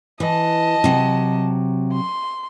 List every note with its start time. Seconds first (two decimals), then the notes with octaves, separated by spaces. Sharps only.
0.20 E3 D#5 A5
0.84 C3 F#3
1.93 C6